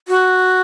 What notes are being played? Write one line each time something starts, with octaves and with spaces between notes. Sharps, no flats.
F#4